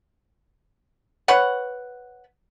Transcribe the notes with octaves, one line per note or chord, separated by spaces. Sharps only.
B4 C#5 F#5